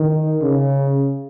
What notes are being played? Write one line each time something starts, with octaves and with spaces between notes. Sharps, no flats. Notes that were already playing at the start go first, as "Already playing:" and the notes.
Already playing: D#3
C#3